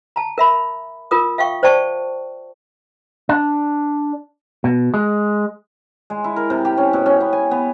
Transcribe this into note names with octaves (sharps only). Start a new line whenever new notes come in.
A5 A#5
A#4 E5 B5
F4 A#4 D#6
E5 F5 G5 C#6
C5 D5 G5 A5 C#6
D4
B2
G#3
G#3
E4
A#4
C3
G4
C#4
B2
C#4
B3
G#5
B3